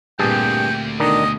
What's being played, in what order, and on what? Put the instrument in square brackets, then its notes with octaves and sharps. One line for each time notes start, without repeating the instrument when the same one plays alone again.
[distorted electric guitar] D2 [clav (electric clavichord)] G2 G#4 A5 [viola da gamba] A#2 C4 G4 [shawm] G5
[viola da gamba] B2 D3 A3 [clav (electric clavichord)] D#3 D4 D#4 [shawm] D#5